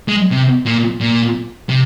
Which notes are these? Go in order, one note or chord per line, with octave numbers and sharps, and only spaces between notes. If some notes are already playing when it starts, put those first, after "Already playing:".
G#3
C3
A#2
A#2
C3